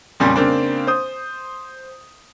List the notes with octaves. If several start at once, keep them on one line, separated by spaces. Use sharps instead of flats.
F2 A#2 C#3 G3 C#4
C#3 A#3 C4 D4
C5 D#6